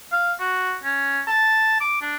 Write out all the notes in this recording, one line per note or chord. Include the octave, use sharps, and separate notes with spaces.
F5
F#4
C#4
A5
D6
D4